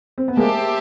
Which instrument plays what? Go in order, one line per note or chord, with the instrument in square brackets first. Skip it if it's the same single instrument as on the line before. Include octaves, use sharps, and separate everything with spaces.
[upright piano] C4
B3
[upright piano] G#3 A#3 [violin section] G4 C5 E5 A5